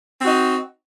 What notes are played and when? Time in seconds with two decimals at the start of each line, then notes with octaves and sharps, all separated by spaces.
0.21 C4
0.24 F#4
0.26 D#4